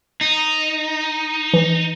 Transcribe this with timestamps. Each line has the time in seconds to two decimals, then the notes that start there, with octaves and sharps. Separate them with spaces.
0.21 D#4
1.53 E3